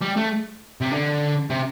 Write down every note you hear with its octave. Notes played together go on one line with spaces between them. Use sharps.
G3
A3
C3
D3
C3